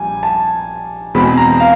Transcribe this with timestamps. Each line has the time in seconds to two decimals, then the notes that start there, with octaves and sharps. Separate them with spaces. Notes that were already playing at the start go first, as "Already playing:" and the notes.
Already playing: A#1 G3 G#5
0.23 A5
1.14 E2 B2 G#3 C4 B5
1.37 A#5
1.60 F5